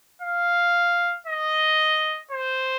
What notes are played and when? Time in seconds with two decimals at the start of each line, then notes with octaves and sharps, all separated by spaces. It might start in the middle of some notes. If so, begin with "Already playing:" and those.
0.22 F5
1.27 D#5
2.31 C5